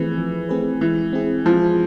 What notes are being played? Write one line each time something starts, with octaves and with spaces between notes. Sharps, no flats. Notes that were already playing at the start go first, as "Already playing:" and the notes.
Already playing: E3 F3 A3 C4 G#4 B4
F3
A3 C4 G#4 B4
E3 G#3
C4 E4 G#4
F3 G#3